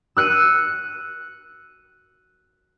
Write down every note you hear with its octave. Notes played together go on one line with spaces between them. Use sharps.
E6 F#6 C#7 D#7